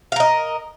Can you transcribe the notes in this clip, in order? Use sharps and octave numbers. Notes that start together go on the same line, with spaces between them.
A#4 D#5 F5